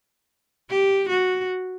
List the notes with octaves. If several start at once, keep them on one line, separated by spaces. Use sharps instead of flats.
G4
F#4